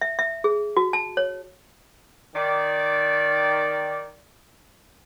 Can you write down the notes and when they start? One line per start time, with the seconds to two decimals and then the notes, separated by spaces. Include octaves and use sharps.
0.01 E5
0.19 E5
0.44 G#4
0.77 F#4
0.93 A5
1.17 C#5
2.35 D#3 D5